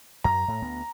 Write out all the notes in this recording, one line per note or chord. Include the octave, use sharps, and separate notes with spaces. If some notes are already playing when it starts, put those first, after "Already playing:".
F#2 A#5
A2
D2 B3